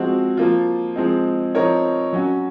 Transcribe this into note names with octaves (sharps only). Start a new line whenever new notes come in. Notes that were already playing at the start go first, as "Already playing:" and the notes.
Already playing: F3 G#3 C4 F#4
F3 A#3 F4
F3 G#3 C4 D#4
F3 C4 D#4 A#4 C#5
F#3 C#4 F#4